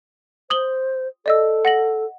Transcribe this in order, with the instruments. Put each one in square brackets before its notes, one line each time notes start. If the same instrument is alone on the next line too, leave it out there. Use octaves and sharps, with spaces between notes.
[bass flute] C5 [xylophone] D#6 F#7 G7
[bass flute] A4 [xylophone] D5 D#5 E6
[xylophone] F#5 A#6 F#7